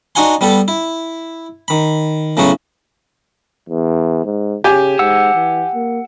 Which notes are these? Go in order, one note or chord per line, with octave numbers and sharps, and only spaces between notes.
D4 D#4 F#4 F#5 G#5 C6
G3 B3 G4 A4
E4
D#3 B5
A2 C#3 F#3 B3 F#4
E2
G#2
C#3 G4 G#5
G#2 F#5 E6
E3
A#3